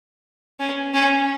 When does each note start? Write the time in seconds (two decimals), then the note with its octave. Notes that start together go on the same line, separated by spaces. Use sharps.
0.60 C#4
0.94 C#4